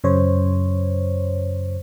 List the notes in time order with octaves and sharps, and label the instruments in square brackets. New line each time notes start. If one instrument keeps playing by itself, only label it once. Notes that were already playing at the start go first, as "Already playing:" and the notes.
[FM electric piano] F#2 C#3 C5 C#5